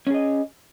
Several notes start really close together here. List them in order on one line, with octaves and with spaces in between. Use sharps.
C#4 G#4 D#5